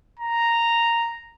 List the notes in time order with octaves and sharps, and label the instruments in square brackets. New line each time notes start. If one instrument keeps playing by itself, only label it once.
[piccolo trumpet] A#5